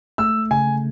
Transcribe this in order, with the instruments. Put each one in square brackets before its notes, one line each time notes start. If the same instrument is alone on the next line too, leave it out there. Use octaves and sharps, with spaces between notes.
[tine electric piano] A3 [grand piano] E6
[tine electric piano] C#3 [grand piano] G#5